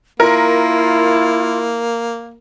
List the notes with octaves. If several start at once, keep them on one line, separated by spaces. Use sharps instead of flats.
A#3 E4 F4 A#4